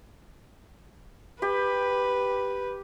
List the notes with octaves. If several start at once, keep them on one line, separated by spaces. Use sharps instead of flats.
G4 B4